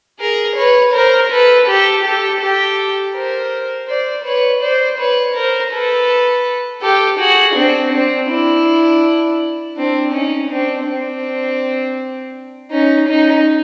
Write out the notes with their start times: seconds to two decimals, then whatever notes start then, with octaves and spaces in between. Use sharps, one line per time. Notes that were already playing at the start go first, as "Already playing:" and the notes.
0.19 G#4 A#4
0.56 B4 C#5
0.93 A#4 C5
1.30 A4 B4
1.67 G4 A4
2.03 G4 A4
2.40 G4 A4
3.13 A#4 C5
3.87 C5 D5
4.24 B4 C#5
4.61 C5 D5
4.98 B4 C#5
5.34 A#4 C5
5.71 A4 B4
6.81 G4 A4
7.19 F#4 G#4
7.55 C4 D4
7.91 C4 D4
8.29 D4 E4
9.76 C4 D4
10.12 C#4 D#4
10.50 C4 D4
10.86 C4 D4
12.70 C#4 D#4
13.07 C#4 D#4